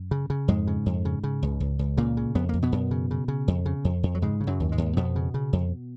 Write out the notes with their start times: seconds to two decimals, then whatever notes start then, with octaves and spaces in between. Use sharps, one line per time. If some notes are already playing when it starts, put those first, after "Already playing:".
Already playing: F#2
0.11 C#3
0.30 C#3
0.48 F2 G#2 G#3
0.67 C#3
0.86 F2
1.05 C#3
1.24 C#3
1.43 C#2
1.60 C#2
1.79 C#2
1.97 A#2 C#3 A#3
2.17 C#3
2.35 F2 B3
2.49 F2 A#3
2.62 B2 B3
2.72 F#2
2.91 C#3
3.11 C#3
3.28 C#3
3.48 F2
3.66 C#3
3.85 F2
4.03 F2
4.15 F#3
4.22 G#2 C#3 G#3
4.40 C#3
4.47 F#2 F#3
4.60 D#2
4.72 G#2 G#3
4.78 D#2
4.97 F2 B2 B3
5.16 C#3
5.34 C#3
5.53 F2